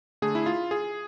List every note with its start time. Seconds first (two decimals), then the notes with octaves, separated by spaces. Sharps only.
0.22 D3 A3 G#4
0.35 E4
0.46 F4
0.71 G#4